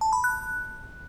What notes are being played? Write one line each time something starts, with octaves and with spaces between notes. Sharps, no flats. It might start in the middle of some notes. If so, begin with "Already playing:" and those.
A5
B5
F#6